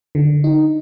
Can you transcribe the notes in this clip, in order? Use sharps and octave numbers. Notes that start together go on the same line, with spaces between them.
D3
D#4